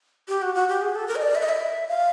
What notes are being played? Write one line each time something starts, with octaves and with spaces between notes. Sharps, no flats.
G4
F#4
F#4
G4
G#4
A4
A#4
D#5
D5
E5
D#5
E5
F5